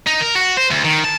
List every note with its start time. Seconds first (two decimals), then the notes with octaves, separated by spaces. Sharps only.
0.07 D#4
0.21 A#4
0.35 F#4
0.57 C5
0.71 D2
0.85 D#3
1.04 A5